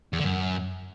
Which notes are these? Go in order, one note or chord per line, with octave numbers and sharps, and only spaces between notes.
E2
D3
F#2